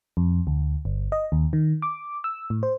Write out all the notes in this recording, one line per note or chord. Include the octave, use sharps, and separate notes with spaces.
F2
D2
G1
D#5
D#2
D#3
D6
E6
A2
C5